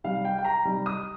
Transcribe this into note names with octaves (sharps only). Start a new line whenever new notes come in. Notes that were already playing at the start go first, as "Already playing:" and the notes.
C3 G3 D#4 F5
G5
G5
A#5
C3 G3 D#4
D#6